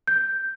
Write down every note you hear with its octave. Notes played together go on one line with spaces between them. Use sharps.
G6